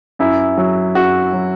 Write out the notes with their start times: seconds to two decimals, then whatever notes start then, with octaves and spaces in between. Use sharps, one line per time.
0.19 F#2 E4
0.58 F#3
0.95 F#2 F#4
1.33 F#3